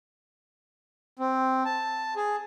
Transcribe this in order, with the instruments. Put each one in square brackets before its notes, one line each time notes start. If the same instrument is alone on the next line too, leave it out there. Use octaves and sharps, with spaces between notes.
[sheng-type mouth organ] C4
A5
G#4